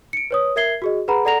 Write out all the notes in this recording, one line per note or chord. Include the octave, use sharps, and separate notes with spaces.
C#7 D7
B4 C#5 D#6
A#4 E5 G#6 C7 G7
F#4 G#4 D#5
G#4 B4 F#5 A#5 B5
A4 D5 F#5 A#5 A#6 F7